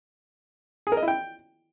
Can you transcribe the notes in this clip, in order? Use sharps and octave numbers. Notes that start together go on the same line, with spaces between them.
G#4
A#4
D#5
E4
G5